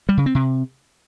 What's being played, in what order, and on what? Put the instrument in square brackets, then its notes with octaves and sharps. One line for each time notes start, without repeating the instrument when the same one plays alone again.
[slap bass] G3
C#3
C4
C3